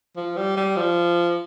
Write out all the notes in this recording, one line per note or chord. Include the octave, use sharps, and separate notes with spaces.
F3
G3
G3
F3